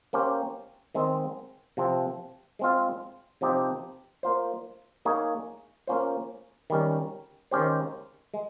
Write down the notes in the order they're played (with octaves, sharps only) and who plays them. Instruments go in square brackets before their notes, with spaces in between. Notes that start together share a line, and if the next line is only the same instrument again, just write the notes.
[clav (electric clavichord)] A#3 C#4 G4 C5
D#3 G#3 C4
C3 F3 C4
G#3 C4 F4
C3 F3 C4 D#4 G4
A#3 F4 C5
A#3 D#4 G#4 C#5
A#3 C#4 F4 C5
D#3 G3 C#4
D#3 G#3 C#4 G4 C5
G#3